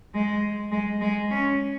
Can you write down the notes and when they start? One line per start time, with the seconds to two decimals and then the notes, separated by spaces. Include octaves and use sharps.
0.14 G#3
0.72 G#3
1.01 G#3
1.30 C#4